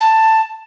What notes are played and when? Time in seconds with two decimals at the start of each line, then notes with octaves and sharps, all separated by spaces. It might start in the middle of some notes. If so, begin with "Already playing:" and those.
0.01 A5